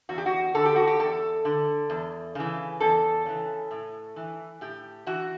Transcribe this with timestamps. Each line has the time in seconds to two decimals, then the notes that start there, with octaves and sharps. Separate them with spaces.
0.09 E2 F#4
0.18 G4
0.26 F#4
0.55 D3 A4
0.65 G4
0.76 F#4
0.88 G4
0.99 E2 A4
1.45 D3
1.90 E2
2.35 C#3 E3
2.80 E2 A4
3.26 C#3 E3
3.71 A2
4.16 E3
4.61 A2 G4
5.06 E3 F#4